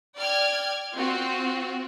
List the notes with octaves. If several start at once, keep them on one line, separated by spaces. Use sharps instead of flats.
D5 G5 F6 G#6
C4 F4 F#4